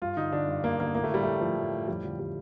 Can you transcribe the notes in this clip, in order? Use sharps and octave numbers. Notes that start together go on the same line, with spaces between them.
G2 F4
D3 D#4
D3 D4
G2
G2 A#3
D3 A#3
A2 A#3
A3
A2 G3
A2 A3
A2 F3
A2
A2
F2 G3
D3 F3
D3 G3